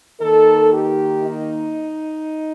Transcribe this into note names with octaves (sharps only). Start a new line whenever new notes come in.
D#3 A#3 D#4 A4
G4
D#4